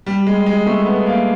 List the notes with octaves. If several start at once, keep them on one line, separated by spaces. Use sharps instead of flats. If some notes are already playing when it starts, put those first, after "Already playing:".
G3
G#3
G#3
A3
B3
A#3